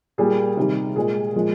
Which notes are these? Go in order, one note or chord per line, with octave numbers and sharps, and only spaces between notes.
A#2 G3 A#3 G#4
C3 D#3 G3
A#2 G#3 G#4
A#2 F3 G#3